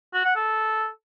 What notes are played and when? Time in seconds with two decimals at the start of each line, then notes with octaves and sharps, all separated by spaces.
0.13 F#4
0.24 F#5
0.36 A4